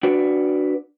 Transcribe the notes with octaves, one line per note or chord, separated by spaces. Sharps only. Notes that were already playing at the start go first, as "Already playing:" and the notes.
D4 F#4 B4 D5